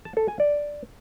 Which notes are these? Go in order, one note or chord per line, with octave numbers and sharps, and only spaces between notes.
A5
A4
G#5
D5